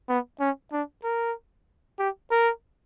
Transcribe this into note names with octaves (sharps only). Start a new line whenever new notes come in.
B3
C#4
D4
A#4
G4
A#4